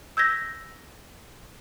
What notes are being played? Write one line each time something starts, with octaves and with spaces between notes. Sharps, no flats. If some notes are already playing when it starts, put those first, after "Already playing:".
E6 G6 G#6 A#6 B6